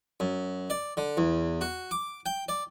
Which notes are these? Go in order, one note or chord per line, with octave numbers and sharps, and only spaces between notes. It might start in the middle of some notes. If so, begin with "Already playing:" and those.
F#2
D5
D3
E2
F#4
D6
G5
D5